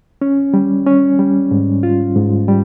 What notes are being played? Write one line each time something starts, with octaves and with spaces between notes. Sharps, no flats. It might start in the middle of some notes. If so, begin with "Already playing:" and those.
C#4
G3
C#4
G3
G#2
F4
G#2
G3